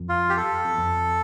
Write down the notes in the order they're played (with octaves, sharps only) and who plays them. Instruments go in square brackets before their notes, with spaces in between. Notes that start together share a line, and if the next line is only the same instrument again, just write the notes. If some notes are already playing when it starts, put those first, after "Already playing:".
Already playing: [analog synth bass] F2
[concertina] F4
G4
A4
[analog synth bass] F2
E2
F2